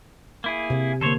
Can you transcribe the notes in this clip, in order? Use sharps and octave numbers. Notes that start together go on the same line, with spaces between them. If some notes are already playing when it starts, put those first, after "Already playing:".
A#3 E4 G#4
C3
D3 A#3 A4 C5 C#5